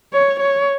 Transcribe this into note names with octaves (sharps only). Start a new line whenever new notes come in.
C#5
C#5